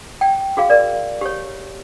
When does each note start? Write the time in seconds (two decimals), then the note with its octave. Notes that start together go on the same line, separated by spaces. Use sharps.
0.21 G5
0.57 F#4 G#4 F5
0.70 A#4 D5
1.21 G4 C#5